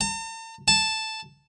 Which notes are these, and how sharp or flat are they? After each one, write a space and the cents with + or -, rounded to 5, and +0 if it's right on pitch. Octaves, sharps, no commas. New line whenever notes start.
A5 +45
A5 +0